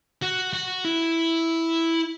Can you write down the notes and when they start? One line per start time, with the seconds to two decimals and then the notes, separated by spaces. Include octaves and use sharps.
0.23 F#4
0.53 F#4
0.85 E4